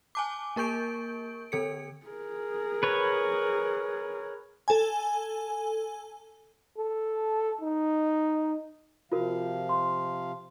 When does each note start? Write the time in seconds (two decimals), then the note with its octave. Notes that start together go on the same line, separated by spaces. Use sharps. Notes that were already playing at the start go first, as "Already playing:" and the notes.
0.15 G#5 A5 D6
0.56 A#3 A#4 C#6 G6 D7
1.52 D3 A4 C#7
2.07 G#4 A#4
2.83 B4 C#5
4.68 A4 G#5
6.78 A4
7.61 D#4
9.12 C3 F3 F4 F#4 A#4 F5
9.69 C6